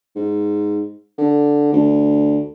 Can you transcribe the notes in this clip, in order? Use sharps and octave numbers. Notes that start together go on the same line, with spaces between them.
G#2
D3
D2